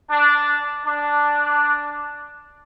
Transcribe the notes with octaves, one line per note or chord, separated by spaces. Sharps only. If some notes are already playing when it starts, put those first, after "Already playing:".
D4
D4